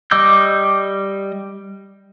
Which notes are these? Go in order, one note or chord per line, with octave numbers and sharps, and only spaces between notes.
G3 D#5 D6 E6 G6